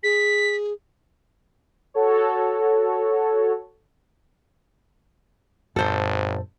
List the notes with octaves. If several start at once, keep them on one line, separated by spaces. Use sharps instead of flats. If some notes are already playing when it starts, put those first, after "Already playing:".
G#4 B6
F#4 A4 C#5
G#1 F#2 A#2 A4 C5